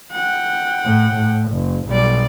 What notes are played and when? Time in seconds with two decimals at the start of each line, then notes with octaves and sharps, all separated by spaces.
0.12 F#5 G5
0.85 A2
1.14 A2
1.52 F#1
1.88 B1 G3 D5